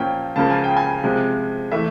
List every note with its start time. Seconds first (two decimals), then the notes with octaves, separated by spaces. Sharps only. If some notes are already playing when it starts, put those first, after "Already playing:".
Already playing: A#2 F3 A#3 C#4 G5
0.36 C#2 C#3 F3 A#3 A5
0.50 G#5
0.64 G5
0.77 G#5
1.04 C3 F3 G#3
1.71 E3 A3 E5